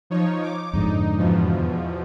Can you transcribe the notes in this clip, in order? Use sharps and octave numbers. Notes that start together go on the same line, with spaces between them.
F3 D#4 C#5
D6
F2 G#2 D3 D#4
E2 B2 F3